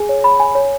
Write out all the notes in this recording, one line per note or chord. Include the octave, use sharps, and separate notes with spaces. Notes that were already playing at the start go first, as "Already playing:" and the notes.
Already playing: G#4 G#5
C#5
B5
G#5
C#5